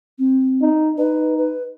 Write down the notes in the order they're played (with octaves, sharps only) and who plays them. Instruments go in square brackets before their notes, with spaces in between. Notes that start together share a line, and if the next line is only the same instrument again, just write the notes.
[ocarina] C4
[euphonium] D#4
[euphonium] D#4 [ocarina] B4
[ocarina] B4